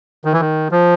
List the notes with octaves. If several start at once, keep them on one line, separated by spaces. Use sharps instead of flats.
D#3
E3
D#3
F3